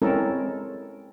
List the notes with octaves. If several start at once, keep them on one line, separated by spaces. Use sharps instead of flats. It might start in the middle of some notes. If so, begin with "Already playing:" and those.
G#3 C4 C#4 E4 A4 A#4